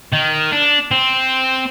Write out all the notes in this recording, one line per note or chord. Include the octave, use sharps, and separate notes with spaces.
D#3
D4
C4